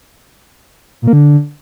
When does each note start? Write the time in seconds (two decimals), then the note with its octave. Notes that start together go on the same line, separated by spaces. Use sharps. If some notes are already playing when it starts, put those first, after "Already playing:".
1.02 A#2
1.07 A#3
1.13 D3